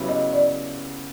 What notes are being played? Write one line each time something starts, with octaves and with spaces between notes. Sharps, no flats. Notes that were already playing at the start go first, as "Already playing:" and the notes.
Already playing: C#3 F#3 B3 E4 G4
D#5
D5